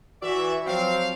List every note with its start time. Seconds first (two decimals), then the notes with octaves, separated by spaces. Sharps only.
0.22 E3 F#4 D5 E5
0.67 F3 F#3 C4 F5